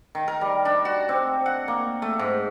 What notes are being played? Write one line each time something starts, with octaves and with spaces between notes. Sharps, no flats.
D#3
A#4
G3
D4
F#4
C4
F#5
A#3
A3
G#2